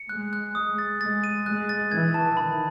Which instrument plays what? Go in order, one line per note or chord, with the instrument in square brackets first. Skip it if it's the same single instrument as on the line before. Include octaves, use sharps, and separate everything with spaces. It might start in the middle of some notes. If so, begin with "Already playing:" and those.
Already playing: [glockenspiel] C#7
[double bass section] G#3 [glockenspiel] F#6
[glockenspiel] F#6
[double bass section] G#3 [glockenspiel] D#6
[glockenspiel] A6
[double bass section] G#3 [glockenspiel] A6
[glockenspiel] D#7
[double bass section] G#3 [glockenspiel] F#6
[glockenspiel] A6
[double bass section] E3 [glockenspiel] G#6
[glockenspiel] A5
[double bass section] D#3 [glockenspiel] B5